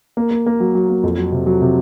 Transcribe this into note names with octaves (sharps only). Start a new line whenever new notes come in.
A#3
A#3
A#3
F#3
F#3
A#3
F2
F#3
C3
F#3
C3